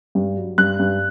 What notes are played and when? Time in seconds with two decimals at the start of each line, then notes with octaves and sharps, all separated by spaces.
0.15 G2
0.37 F#3
0.58 G2 F#6
0.79 G2